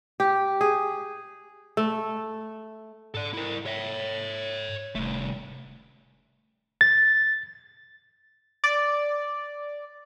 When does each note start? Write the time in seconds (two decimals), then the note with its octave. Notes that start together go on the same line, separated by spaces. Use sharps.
0.20 G4
0.61 G#4
1.77 A3
3.15 G#2 A4 D5
3.33 E4 A#4
3.66 C#5 E5
4.95 E1 C2 A3
6.81 A6
8.64 D5